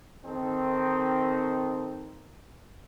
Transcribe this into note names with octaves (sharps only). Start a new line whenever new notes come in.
D#3 C4 D#4 A4